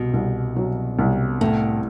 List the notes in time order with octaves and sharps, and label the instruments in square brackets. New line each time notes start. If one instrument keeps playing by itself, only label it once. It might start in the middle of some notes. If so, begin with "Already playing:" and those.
Already playing: [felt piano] C2 [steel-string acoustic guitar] B2
[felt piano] C2
F#3
C2
[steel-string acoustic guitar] A2 [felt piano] A3